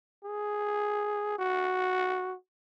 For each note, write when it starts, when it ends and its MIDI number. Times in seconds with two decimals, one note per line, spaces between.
0.24 1.35 68
1.39 2.35 66